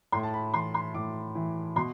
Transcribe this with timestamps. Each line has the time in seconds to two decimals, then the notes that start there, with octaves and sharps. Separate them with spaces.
0.12 A2 C6
0.23 A5
0.34 B5
0.53 E3 C6
0.74 C6
0.94 A2 D6
1.35 E3
1.76 B2 C6